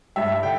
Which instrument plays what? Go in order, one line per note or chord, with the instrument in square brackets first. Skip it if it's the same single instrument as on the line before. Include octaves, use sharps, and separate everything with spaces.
[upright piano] G2 E5
D3 G5